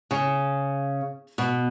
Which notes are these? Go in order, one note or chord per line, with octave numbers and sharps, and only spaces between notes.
C#3
B2